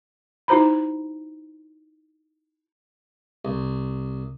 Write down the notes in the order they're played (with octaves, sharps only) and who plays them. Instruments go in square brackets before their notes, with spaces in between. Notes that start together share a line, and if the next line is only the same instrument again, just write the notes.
[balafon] D#4 E4 F#4 C5 A#5 B5
[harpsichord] C2